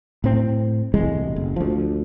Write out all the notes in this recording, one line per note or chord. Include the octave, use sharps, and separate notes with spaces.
A2 C4
E1 C2 A2 G#3
F#1
D2 F3